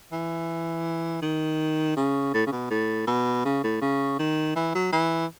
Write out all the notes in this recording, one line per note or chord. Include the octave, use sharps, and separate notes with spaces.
E3
D#3
C#3
A2
C#3
B2
A2
B2
C#3
A2
C#3
D#3
E3
F#3
E3